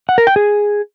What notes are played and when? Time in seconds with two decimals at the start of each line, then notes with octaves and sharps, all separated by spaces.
0.09 F#5
0.18 A#4
0.27 G5
0.36 G#4